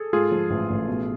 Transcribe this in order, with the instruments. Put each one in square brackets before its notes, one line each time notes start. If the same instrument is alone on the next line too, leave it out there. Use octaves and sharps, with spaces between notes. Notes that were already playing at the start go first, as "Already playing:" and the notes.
Already playing: [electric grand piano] G#4 A4
[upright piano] G#2 [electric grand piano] F4 G#4
[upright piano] F3
A1
A1
B2